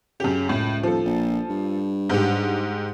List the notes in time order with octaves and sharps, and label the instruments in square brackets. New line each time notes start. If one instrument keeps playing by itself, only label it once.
[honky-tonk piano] F#2 G4 [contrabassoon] C#3
[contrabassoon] C#2 [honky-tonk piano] A2
[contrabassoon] D#1 [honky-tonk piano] F3 A4
[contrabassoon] A#1
G2
[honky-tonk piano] G#2 G4